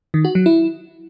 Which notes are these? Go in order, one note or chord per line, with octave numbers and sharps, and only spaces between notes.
D#3
F#4
F#3
E4